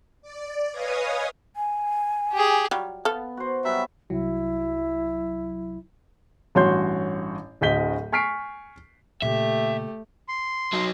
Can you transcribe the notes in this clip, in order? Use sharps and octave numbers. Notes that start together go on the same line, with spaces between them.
D5
B4 C#5 D#5 F5 G#5 D#6
G#5
G4 G#4
F#3 G3 F4
B3 A4 F5
F#4 C5
F#3 G3 B3 E5
C2 F#3 E4
A1 G2 F#4 C#5 C6 G6
D1 D2 D#5 G6 B6 G7
G#5 C#6 F6 B6 C7 D7
A#2 C#3 A3 G4 E5
C6
F#3 D#4